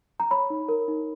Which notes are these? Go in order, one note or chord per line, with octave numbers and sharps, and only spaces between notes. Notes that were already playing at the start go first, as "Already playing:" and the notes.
A#5
C#5 B5
D#4
A#4
D#4